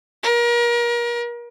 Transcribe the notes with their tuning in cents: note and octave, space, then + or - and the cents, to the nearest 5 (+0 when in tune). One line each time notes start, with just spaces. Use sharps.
A#4 +35